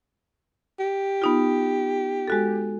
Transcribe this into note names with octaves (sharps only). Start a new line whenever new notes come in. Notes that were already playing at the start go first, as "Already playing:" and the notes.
G4
B3 D#4 F4
G#3 F#4 A4